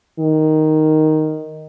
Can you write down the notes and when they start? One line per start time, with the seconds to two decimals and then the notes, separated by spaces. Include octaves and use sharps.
0.20 D#3